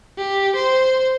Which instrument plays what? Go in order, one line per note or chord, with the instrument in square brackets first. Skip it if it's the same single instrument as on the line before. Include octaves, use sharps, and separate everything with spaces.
[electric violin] G4
C5